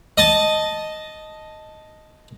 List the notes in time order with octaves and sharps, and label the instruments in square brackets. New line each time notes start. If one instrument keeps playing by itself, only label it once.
[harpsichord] D#5 A5